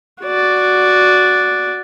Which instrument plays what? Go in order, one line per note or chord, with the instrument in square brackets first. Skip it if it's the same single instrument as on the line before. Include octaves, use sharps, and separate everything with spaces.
[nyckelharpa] F#4 D5